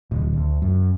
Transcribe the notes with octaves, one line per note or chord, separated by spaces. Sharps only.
D1
D2
F#2